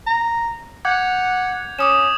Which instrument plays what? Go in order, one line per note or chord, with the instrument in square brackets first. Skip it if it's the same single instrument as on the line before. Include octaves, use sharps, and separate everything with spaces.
[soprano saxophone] A#5
[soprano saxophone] F#5 [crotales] D6 G6 G#6
[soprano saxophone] C#4 [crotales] D6 D#6 E7